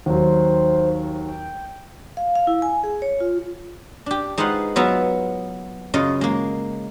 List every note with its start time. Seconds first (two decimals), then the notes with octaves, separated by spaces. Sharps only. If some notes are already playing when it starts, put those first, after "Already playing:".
0.06 D#2 F#3 C5
1.27 G5
2.17 F5
2.35 F5
2.47 E4
2.62 G#5
2.84 G#4
3.02 C#5
3.20 F4
4.06 D4 G4
4.38 G#3 D#4 F4 B4 C5 F#5
4.76 F#3 B3 F4 E5 A#5
5.94 F#2 C#3 F4 D#5
6.21 G#3 A#3